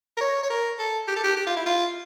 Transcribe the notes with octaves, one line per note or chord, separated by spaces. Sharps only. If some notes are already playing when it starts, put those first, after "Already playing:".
A#4
C#5
C#5
A#4
A4
G4
A4
G4
G4
F4
E4
F4